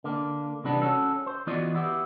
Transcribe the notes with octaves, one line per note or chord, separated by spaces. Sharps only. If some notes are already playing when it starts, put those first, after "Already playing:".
D3 A#3
C3 E3 G3 B3 D4
C#4 F#4 A4
C5
E3 B3 F4 F#4 D5 D#5
B3 E4 G4